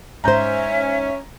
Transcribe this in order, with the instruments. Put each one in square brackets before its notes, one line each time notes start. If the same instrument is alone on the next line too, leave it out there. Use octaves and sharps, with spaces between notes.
[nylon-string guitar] G#2 C5 [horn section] C#4 [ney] E5 [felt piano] A#5 G6